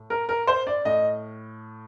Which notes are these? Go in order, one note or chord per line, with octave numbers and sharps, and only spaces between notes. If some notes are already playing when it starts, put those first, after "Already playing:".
Already playing: A2
A#4
A#4
C5
D5
A2 D#5